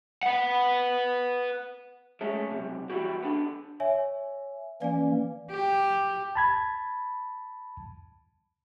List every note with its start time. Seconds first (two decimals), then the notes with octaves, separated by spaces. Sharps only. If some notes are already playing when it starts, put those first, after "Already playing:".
0.23 B4 F#5
2.21 G#3 A3 C#4
2.50 B1 C3
2.90 E3 G3 B3 E4 F#4 G4
3.23 B3 D4 A4
3.80 C#5 E5 G#5
4.82 E3 A#3 C#4 D5 F5 G#5
5.51 G4
6.35 A5 B5 G#6